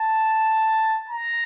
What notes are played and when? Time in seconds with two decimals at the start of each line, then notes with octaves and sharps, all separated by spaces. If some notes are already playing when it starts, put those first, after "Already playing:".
Already playing: A5
1.09 A#5